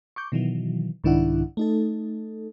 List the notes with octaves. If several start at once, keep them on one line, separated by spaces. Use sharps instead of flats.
C#6 D6 G6
B2 D#3 E3 F#3
C2 G#2 D#3 D4 E4 F#5
A3 D#4 A4